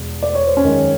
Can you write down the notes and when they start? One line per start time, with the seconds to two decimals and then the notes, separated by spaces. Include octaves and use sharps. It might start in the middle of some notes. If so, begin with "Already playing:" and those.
Already playing: E2 B2 G#3
0.23 D5
0.35 C#5
0.47 C5
0.57 C#4 C#5
0.63 F#2 D#3 G#3